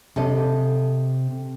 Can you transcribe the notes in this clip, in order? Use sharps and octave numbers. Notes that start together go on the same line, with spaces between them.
C3 A4 D#5